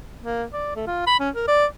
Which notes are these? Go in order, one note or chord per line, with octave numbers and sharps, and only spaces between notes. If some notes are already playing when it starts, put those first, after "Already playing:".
A#3
D5
A3
F4
B5
C#4
A#4
D5